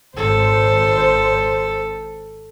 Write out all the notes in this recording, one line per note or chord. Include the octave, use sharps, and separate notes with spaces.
G#1 A4 C5